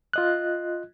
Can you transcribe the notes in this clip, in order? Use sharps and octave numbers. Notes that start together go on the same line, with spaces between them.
F4 D#5 F#6